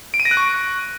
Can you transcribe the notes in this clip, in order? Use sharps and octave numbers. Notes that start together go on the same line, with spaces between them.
D7
D#7
A#6
F#6
C#6